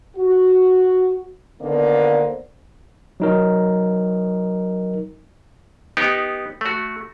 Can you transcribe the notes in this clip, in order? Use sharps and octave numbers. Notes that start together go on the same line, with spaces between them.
F#4
D3 D#3 A#3 B3 C5 D5
F#3 D#4 A#4
B3 D#4 G4
A3 F#4